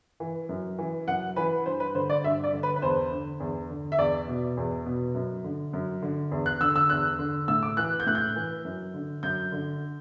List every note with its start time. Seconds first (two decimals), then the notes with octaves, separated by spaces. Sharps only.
0.20 E3
0.49 F#2
0.79 E3
1.08 F#2 F#5
1.36 E3 B4
1.66 G2 C5
1.80 B4
1.95 D3 C5
2.10 D5
2.24 G2 E5
2.44 D5
2.53 D3
2.63 B4
2.76 B4
2.82 E2 C5
3.11 D3
3.40 E2
3.70 D3
3.92 E5
3.98 E2 D5
4.28 B2
4.57 E2
4.86 B2
5.15 F#2
5.44 D3
5.73 F#2
6.02 D3
6.32 E2
6.46 F#6
6.61 D3 E6
6.76 E6
6.90 E2 F#6
7.19 D3
7.48 A2 E6
7.63 D6
7.77 E3 F#6
8.00 G6
8.07 A2 F#6
8.15 G6
8.36 E3
8.65 F#2
8.94 D3
9.23 F#2 G6
9.52 D3